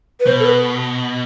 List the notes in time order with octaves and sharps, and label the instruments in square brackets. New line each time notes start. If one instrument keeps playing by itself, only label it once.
[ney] B4
[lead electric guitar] B2 [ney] C5
[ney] A4
B4